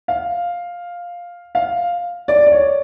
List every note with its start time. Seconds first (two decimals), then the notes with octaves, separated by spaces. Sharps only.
0.08 F5
1.55 F5
2.28 D5
2.47 D5
2.52 C#5